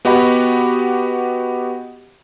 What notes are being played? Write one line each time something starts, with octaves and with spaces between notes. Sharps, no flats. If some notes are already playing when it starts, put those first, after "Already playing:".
B3 F#4 G4 D#5 F#5 B5